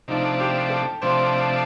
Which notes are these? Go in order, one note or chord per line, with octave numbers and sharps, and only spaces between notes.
C3 F3 A3 D4 D#4
G4
A4
C3 F3 A3 D4 C5